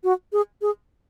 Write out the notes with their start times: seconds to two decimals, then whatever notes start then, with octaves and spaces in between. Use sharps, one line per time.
0.04 F#4
0.33 G#4
0.62 G#4